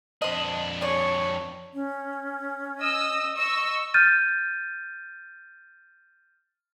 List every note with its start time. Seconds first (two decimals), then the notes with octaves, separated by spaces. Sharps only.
0.22 F2 D4 C5 D#5
0.81 G#4 C#5 D5
1.74 C#4
2.81 D#5 D#6 E6
3.37 D#5 C#6 E6
3.94 F6 G6 A6 D#7